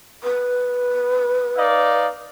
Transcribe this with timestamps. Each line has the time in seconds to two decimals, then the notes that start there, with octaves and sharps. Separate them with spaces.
0.24 B4
1.58 D#4 D5 F5